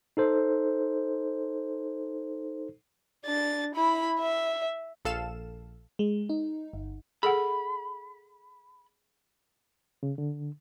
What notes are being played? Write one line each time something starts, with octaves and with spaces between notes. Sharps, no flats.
D#4 A4 C5
D4 A6
E4 B5
E5
A#1 A4 F5 E7
G#3
D#4
G1
G#4 A4 F#5 B5
C#3
D3